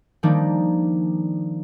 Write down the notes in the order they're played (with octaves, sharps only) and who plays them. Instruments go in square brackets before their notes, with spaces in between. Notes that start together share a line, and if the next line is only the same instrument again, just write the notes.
[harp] D#3 F3 G3 A#3 D4 D#4